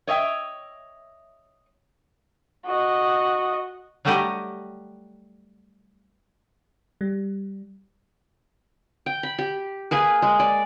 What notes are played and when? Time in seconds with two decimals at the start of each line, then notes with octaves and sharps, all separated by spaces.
0.07 C#5 D#5 E5 G5
2.66 F#4 D#5
4.05 F#3 G3 A3 F#4 G4 D#5
7.01 G3
9.06 G5
9.23 B5
9.38 G4
9.91 A#3 G#4 B4
10.22 G#3
10.39 D5